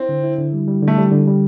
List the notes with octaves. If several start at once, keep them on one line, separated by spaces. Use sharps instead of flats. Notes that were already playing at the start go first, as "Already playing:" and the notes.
Already playing: C4 E4
D3
E4
D3
G3
G3
D3
A3
G3
D3
G3